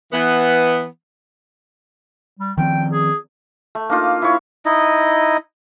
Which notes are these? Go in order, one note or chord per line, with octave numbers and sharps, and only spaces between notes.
E3 B3
G3
D#3 F3 C4 G5
G#4
A3
A#3 D4 D#4 F4
E4 C#5 B5
D#4 E4 D#5